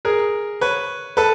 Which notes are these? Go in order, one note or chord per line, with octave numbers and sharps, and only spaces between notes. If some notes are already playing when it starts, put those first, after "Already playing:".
G#4 A#4
B4 C#5
A4 B4